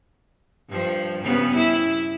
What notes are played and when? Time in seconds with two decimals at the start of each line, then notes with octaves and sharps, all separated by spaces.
0.70 G2 F3
1.24 G2 C#3 B3
1.55 E4